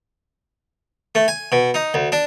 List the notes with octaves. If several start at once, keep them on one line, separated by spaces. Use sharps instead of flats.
A3
G#5
B2
D#4
D2
D4